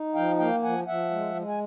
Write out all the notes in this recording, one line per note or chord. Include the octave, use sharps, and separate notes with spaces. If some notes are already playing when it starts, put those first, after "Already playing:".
Already playing: D#4
F3 F5 G5
A#3 F5 G5
F3 F#5 G#5
F3 E5 F#5
G#3
G#3
G#5